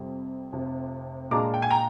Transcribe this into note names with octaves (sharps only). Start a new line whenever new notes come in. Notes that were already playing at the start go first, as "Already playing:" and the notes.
Already playing: F2 C3 G3
F1 F2 C3
A#2 G#3 D4 F4 A#5 D6
G5
G#5
G5 A#5